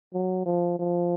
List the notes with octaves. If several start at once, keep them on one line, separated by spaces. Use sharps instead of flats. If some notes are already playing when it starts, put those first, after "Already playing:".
F#3
F3
F3